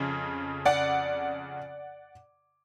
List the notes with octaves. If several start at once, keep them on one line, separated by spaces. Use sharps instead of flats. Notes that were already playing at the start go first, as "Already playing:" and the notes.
Already playing: F2 C#3
D5 F#5